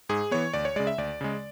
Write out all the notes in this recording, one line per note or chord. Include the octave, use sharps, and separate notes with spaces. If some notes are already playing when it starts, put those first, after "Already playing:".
G#2 G#4
E3 B3 C#5
D2 D5
C#5
C#3 G#3 D5
E5
D2 D5
C#3 G#3